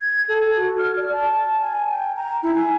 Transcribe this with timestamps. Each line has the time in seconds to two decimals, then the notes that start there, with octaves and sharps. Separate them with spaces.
0.01 G#6
0.29 A4
0.56 F#4
0.78 F6
0.97 D5
1.12 A5
1.62 G#5
1.91 G5
2.17 A#5
2.43 E4
2.55 G#5